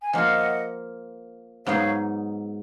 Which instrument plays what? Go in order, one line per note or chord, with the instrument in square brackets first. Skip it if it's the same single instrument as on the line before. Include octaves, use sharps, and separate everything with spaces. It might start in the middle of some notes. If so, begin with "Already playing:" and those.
[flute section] G#5
[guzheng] F3 A#3 F4 [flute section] D#5 F#5
[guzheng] G#2 F#3 B3 D#4 [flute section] C#5 F5